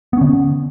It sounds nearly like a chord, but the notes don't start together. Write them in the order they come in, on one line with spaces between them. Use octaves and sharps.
B3 C#4 D3